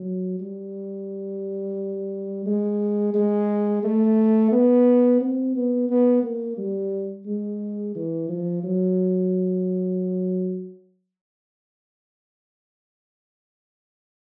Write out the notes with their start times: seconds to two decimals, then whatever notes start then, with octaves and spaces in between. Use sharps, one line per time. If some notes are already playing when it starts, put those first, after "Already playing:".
Already playing: F#3
0.39 G3
2.46 G#3
3.14 G#3
3.83 A3
4.52 B3
5.21 C4
5.55 B3
5.90 B3
6.23 A#3
6.57 G3
7.26 G#3
7.95 E3
8.29 F3
8.63 F#3